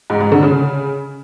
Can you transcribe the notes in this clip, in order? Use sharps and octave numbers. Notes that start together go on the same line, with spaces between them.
G#2
G#2
D3
C#3